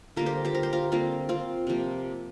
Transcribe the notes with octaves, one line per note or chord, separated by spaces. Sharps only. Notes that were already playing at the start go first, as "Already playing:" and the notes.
D3 G3 A#3 F4 A#4
G4 C5
G4 C5
A#4
C5
F4 A#4
D3 G3 A#3 C4 F4
C4 F4
C3 F3 A#3